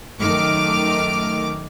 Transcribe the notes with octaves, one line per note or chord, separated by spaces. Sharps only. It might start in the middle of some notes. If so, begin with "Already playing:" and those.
F#2 D#3 A3 D6 F6